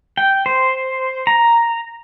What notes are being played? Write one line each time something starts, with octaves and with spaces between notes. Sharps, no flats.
G5
C5
A#5